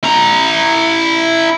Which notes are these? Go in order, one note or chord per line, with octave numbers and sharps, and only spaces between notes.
E4 A#5